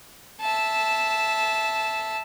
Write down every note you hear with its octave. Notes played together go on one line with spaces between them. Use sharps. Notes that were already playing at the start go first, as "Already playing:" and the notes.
E5 A5